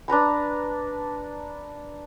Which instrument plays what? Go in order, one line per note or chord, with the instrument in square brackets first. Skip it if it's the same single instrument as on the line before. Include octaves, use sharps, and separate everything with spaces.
[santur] D4 B4 A#5 B5